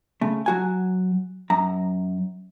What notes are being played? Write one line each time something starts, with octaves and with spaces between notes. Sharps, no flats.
C#3 A3
F#3 F#4 G#5
F#2 A#5